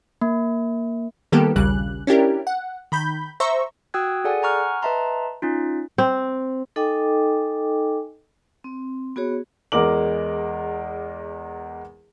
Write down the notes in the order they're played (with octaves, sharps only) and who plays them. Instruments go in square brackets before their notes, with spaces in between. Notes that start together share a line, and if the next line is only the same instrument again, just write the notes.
[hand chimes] A#3
[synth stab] D#3 G3 A#3 B3 G4 A4
A#1 D#2 C#3 G3 F#6
C#4 D4 E4 G4 A#4
F#5
D#3 B5 G6
C5 E5 A#5 C#6
[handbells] F#4 G5 D#6 E6 F#6 G#6
G#4 A4 D5 F#5 G#5
F#5 G#5 A#5 C#6 F6 F#6
B4 D#5 E5 A5 A#5 C6
C#4 D#4 F4
[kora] C4
[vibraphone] D#4 A4 D#5 G5 G#5 D6
C4
B3 F#4 G#4 C#5
[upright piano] E2 G#3 A#4 D6 F#7